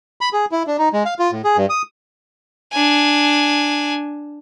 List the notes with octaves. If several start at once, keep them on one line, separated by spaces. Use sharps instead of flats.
B5
G#4
E4
D4
D#4
G#3
F5
F4
A2
G#4
G2
D#6
D4 G#5